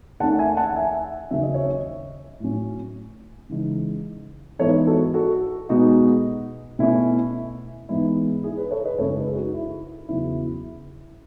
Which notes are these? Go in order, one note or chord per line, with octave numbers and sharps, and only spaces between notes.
D#2 D#3 A3 C#4 F#5 A5
E5 G#5
F#5 A5
E5 G#5
D#2 C#3 F#3 C#4 E5
D#5
C#5 E5
A2 F#3 C#4
C#3 E3 G#3 D#4
G#2 E3 B3 D#4 A4 C#5
F#4 A4
F#4 A4
B2 G#3 B3 D#4 F#4
B2 A3 C#4 E4
G#2 E3 G#3 B3 D#4 E4
E4 G#4
G#4 B4
A4 C#5
B4 D#5
F#2 C#3 G#3 C#4 A4 C#5
G#4 B4
D#4 F#4
E4
E2 C#3 F#3 E4